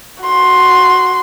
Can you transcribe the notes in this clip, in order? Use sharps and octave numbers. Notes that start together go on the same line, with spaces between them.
F#4 C6